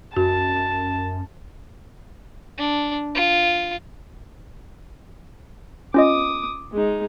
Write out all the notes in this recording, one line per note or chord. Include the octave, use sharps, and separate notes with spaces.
F#2 F#4 A5
D4
F4
C#4 F4 D#5 D6 D#6
G#3 D#4